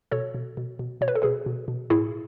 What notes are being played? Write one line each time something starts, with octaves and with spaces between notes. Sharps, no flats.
B2 A4 C#5
B2
B2
B2
B2 C#5
B4
A4
B2 G#4 B4
B2
B2
A2 E4 G#4